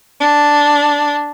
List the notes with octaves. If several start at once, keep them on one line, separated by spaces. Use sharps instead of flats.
D4